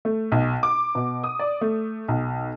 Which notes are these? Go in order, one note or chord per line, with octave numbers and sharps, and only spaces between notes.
A3
B1
D6
B2
D#6
D5
A3
B1